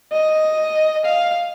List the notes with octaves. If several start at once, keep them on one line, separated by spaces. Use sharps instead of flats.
D#5
F5